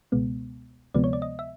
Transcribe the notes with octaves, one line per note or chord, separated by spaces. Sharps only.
C#2 B2 G#3 B3
D2 C3 F3 G#3 B3 D5
C#5
D5
D#5
E5